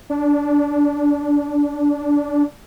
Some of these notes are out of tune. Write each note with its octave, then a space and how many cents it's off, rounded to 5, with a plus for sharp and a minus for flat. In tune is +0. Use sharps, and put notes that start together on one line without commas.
D4 -15